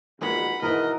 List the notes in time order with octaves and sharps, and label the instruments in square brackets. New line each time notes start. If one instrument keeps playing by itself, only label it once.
[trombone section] A#1 B2 B3 [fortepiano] D#3 G#3 [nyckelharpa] F#5 B5
[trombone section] G#2 [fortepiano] B2 D#3 E3 [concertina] A#4 [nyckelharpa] D#5